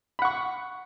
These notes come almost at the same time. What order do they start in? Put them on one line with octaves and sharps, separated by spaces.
B5 F#5 C#6